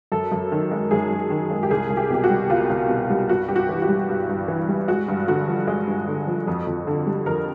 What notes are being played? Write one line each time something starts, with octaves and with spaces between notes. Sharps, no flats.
F#2 A4
F#2
D#3
G#3
F#2 G#4
F#2
D#3
G#3
G4
C2 G#4
C2
G4
B2 G4
F#4
G3
C2 F4
C2
B2
G3
G2 F#4
G2 G4
F#4
E3
F#4
G3
G2
G2
E3
G3
G#3 F#4
G2
D3 F#4
F3
G#3
G2
D3
F3
F2
F2
D3
G3
F2 A#4